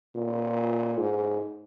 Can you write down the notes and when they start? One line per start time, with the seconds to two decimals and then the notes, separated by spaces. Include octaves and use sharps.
0.15 A#2
0.97 G#2